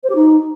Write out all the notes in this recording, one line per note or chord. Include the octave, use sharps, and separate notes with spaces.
C5
G4
D#4